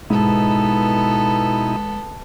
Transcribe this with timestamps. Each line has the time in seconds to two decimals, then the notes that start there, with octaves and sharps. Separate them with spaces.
0.10 G#2 B2 B3 D#4 E4 A4